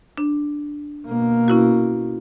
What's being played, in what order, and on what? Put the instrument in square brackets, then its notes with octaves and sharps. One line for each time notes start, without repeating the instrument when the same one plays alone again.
[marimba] D4
[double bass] B2 A#3
[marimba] C#4 E4 F#4